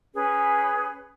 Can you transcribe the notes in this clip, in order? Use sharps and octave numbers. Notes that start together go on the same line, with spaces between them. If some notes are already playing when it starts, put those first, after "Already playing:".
C#4 G#4 B4